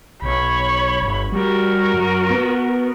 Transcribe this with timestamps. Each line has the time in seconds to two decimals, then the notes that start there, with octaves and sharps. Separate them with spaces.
0.22 B1 C#5 B5
1.02 G1
1.32 G3 F#4 A#4
1.94 F#2
2.30 B3